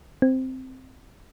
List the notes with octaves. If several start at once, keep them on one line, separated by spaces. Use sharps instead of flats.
C4